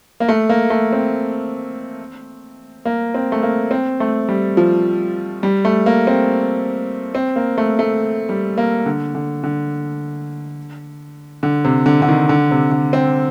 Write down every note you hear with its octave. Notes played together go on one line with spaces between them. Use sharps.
A#3
A3
A#3
A3
C4
A#3
C4
A3
A#3
C4
A3
G3
F3
G3
A3
A#3
C4
C4
A#3
A3
A3
G3
A#3
D3
D3
D3
D3
C3
D3
D3
D#3
D3
C3
D3
C4